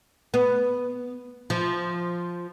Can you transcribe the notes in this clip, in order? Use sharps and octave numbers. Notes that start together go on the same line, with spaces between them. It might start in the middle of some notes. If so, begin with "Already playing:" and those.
B3
F3